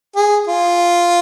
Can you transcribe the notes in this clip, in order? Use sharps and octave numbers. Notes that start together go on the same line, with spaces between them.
G#4
F4